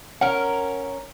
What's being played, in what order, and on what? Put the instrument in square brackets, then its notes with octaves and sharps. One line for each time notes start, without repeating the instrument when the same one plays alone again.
[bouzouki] C#4 A#4 [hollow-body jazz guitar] F#5